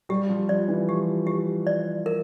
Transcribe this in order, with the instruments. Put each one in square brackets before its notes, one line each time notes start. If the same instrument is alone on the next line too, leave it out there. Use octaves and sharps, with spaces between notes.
[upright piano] G3 [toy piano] G4
[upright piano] F3
[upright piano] F3 [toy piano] D5
[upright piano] E3
[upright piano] F3 [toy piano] G4
[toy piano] G4
D5
A#4